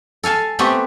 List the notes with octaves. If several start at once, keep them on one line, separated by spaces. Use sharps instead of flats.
A4 F5 G#5 A5
A3 B3 C4 F#4 G4